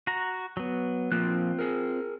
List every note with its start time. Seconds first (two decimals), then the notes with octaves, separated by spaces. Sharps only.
0.07 F#4 A#5
0.57 F#3 B3
1.12 F3 A#3 C4 F4 F#6
1.59 G#4 A#4